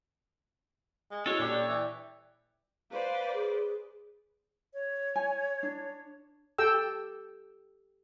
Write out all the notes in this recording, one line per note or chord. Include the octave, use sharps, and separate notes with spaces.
G#3
G#3 C#4 E4 F#4 A4 C#5
A#2 G3 D4 G4
E3
B4 C5 D5 F5
G#4
C#5
G#5
D4
G4 A4 G5 E6